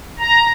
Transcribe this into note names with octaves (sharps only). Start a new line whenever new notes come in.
A#5